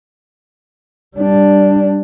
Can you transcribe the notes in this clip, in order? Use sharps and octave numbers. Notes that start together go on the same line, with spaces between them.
G3 D4